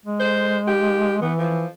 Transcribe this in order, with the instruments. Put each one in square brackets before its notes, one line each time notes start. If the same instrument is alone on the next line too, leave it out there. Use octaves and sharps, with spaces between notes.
[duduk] G#3
[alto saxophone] C5
G4
[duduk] E3 [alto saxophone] B3
[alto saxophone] F3